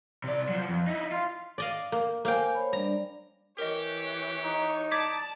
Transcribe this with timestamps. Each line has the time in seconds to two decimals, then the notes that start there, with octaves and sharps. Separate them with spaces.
0.24 C3 D5
0.49 F#3 F4
0.69 F2
0.87 D#4 E4
1.12 F4
1.58 D5 D#5 F5
1.92 A#3
2.25 A#3 C5 F5 G5 G#5
2.55 C5 C#5 B5
2.73 G3 D4 D5 A#5
3.58 E3 G4 A#4 C#5 D#5
4.44 D#4
4.91 D5 A5 D6 G#6 B6